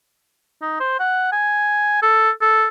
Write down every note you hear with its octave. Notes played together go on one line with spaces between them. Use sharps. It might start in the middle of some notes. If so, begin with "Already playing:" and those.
D#4
C5
F#5
G#5
A4
A4